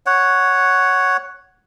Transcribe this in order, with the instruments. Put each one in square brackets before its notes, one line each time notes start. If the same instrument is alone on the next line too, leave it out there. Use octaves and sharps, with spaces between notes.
[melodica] C#5 F#5